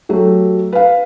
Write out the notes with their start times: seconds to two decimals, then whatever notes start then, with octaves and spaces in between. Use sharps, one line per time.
0.09 F#3 A3 G4
0.73 B4 F5